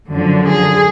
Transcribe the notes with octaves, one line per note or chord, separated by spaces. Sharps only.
F#2 D3 F3
G#4